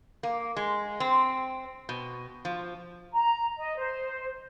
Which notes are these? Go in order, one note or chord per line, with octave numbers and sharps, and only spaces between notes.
A#3
G#3
C4
B2
F3
A#5
D#5
C5